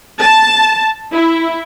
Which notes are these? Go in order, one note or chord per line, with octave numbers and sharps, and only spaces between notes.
A5
E4